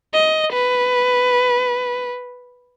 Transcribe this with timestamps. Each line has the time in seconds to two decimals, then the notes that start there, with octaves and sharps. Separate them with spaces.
0.13 D#5
0.53 B4